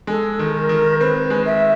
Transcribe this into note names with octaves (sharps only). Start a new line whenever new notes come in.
G#3 A4
D#3
A#4
D#3
C4 B4
G#3
E5